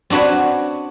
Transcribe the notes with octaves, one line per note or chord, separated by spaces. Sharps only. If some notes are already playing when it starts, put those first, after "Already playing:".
C4 D4 F#4 B4 C#5